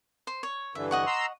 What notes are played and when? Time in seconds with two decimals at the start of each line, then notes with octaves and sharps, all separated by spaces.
0.27 C5
0.43 C#5
0.75 G2 D3 E3 E5
0.91 D#5 F#5 C#6
1.07 A#5 C6 E6